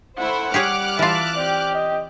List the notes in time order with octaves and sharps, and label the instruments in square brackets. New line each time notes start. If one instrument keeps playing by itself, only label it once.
[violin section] A3 E4 C5 [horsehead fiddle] F#5
[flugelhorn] G3 [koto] G4 G#4 C#5 [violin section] D6 F6 F#6
[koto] E3 F4 [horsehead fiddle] E5 A5
[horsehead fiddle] C4 G4 [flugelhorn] D5
[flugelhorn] D#5